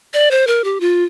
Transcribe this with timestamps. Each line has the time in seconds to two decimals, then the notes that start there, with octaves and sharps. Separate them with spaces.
0.14 D5
0.31 C5
0.47 A#4
0.64 G4
0.80 F4